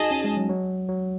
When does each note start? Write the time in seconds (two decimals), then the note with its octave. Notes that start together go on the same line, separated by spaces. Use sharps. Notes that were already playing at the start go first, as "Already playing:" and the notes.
Already playing: D#4 F#4 G#4 D#5 A5
0.11 C#4
0.24 G#3
0.37 F#3
0.49 F#3
0.89 F#3